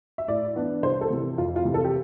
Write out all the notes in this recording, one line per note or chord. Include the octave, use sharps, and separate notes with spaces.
E5
A2 D5
E3 B3 D4
C2 C5
A4
C3 E3
F2 F4
F4
C3 E3
A4
G4